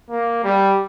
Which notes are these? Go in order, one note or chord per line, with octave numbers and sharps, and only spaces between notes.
A#3
G3